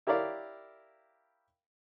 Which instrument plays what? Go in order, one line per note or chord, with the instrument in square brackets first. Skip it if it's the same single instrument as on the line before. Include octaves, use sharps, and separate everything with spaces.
[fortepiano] E4 G4 A#4 C#5 D5 F5